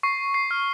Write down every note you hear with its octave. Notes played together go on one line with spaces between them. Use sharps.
C#6 C7
C7
F6